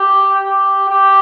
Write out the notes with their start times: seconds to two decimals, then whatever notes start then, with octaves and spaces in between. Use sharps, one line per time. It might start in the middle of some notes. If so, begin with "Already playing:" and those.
Already playing: G4
0.49 G4
0.90 G4